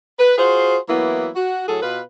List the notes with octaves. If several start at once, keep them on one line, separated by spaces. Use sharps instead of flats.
B4
F4 F#4 G#4 C5
E3 F#3 A#3 B3 E4
F#4
A2 F#3 G#4 A4
B2 F4 B4